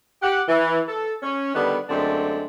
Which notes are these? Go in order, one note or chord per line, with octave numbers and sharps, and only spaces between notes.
G4 F#5
E3
A4
C#4
D3 D#3 G3 B3
F#2 D3 G#3 A3 C4 D4